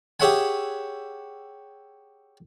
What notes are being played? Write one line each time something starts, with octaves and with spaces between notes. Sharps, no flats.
G4 G#4 C#5 E5 F#5 G#5